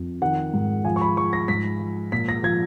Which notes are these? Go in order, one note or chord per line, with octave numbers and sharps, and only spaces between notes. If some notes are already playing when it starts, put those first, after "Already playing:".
Already playing: F2
D#3 F#5
G#2
F3 G#5
C#6
B5
F3 C#6
A#6
G#2 B6
F3
A#2 B6
A#6
F3 G#6